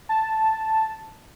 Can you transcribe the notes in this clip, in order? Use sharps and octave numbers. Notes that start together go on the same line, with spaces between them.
A5